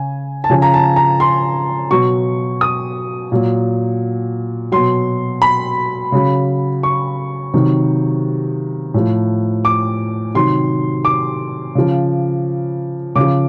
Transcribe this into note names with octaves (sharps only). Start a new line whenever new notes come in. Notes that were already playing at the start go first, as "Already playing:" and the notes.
Already playing: C#3 G#5
A5
C#3 F3 G#5
A#5
A5
A#5
C6
B2 F#3 C#6
D#6
A#2 F#3
B2 F#3 C6
B5
C#3 F#3
C#6
C3 D#3 F#3
A2 F3
D6
C3 D#3 F#3 C6
D6
C#3 F3
C#3 D6
F3